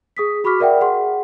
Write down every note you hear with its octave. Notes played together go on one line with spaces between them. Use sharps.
G#4 D#6 B6
F#4 B5 C#6 D6 F6 B6
A#4 D5 E5 F#5 G5
G#4 F#5 C6